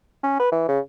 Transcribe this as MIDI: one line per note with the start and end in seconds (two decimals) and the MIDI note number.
0.23 0.38 61
0.40 0.51 71
0.52 0.67 52
0.68 0.80 49